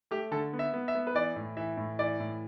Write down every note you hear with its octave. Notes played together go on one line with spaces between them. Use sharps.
A3 G4
D3 A4
B3
E5
B3
E5
B3
B4
E3 D5
A2
E3 E5
A2
E3 D5
A2